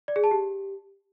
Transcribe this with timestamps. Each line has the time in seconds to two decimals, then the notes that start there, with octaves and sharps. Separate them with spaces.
0.08 D5
0.16 G#4
0.24 A5
0.31 G4